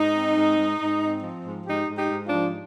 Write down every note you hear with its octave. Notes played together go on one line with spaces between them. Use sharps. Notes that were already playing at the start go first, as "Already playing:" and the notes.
Already playing: G#2 D#4
C4
G#2
G#2
G#2
C4
F3
G#2
G#2 D#4 G4
G#2
D#4 G4
G#2
D4 F4
F3